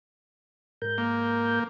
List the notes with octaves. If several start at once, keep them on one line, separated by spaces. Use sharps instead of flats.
G#2 A#4 G6
A#3